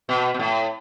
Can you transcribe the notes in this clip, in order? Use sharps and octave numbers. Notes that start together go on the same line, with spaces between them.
B2
B2
A2